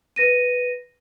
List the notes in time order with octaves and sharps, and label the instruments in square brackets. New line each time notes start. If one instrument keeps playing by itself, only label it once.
[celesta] B4 A#6 D#7